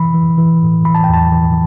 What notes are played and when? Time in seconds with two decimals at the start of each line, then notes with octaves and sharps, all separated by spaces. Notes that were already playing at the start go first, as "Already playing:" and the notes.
Already playing: E3 B5
0.14 E3
0.38 E3
0.62 A2
0.85 E3 B5
0.95 A5
1.04 G5
1.09 E2 A5
1.32 E3